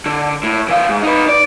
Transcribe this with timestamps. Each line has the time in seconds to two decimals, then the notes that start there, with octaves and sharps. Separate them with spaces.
0.06 D3
0.43 A2
0.68 E3 F5
0.89 G#2
1.03 D#4 B4
1.29 D5